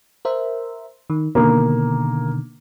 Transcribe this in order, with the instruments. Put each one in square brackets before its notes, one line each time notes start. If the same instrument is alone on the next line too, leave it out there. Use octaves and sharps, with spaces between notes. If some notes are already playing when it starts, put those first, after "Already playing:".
[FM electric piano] A#4 C5 E5
D#3
[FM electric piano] B2 D3 D#3 [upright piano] A#3